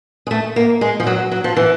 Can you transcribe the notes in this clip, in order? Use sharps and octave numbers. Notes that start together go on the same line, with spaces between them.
G#3
A3
A#3
G#3
F3
F#3
F#3
F3
E3